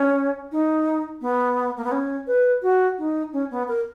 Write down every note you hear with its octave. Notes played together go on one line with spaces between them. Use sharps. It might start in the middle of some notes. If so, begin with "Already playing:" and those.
Already playing: C#4
D#4
B3
A#3
B3
C#4
B4
F#4
D#4
C#4
B3
A#4